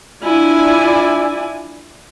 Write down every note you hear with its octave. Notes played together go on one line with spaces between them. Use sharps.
D4 E4 F4 D5 G#5